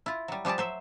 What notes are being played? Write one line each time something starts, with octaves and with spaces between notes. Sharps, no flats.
E4 F4
F#3 G3
F3 G3 G4 G#4 A5
F#3 C5 E5